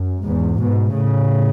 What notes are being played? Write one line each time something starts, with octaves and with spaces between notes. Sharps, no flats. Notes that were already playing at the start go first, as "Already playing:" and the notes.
Already playing: F#2
E2 G#2
G#2 B2
A2 C#3